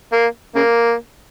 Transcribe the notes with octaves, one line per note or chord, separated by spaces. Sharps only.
A#3
C#3 A#3